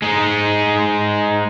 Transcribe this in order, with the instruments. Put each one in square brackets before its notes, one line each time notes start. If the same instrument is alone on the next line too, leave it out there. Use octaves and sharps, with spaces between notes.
[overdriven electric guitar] G#3 D#4